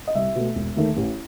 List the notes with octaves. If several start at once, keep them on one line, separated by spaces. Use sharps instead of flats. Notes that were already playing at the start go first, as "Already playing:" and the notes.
D#5
C2 E5
B2 A3
E1
D#2 D#3 A3
A1